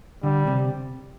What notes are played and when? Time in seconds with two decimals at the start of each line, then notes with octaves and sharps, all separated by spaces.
0.23 D3 G3
0.47 C3